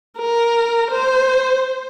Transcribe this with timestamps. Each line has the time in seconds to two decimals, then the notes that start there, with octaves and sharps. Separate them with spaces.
0.18 A#4
0.91 C5